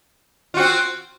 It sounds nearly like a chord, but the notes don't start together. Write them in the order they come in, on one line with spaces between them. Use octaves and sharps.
F4 F#4 C4